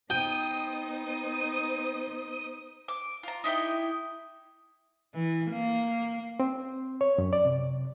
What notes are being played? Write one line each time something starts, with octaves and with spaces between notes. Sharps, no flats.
B3 D#4 C5 G5 D#6
D6
F4 A#5
D#4 E4 G4 D#5
E3
A#3
C4
C#5
F#2
D5
C3